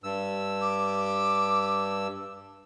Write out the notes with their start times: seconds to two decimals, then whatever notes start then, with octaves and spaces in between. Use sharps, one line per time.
0.04 G2 E6
0.62 D6